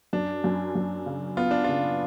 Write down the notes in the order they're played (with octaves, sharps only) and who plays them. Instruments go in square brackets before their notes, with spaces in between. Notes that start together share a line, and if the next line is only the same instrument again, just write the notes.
[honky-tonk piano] F#2 [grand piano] D4
[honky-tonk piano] F#2
F#2
C#3
[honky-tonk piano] B3 [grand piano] F4
[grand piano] D4
[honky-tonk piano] C#3 [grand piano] F4